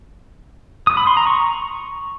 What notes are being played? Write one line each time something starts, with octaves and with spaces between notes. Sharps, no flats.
D#6
B5
C6
A#5
C#6